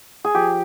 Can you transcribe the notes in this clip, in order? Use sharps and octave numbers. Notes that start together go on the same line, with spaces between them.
G#4
F3 G4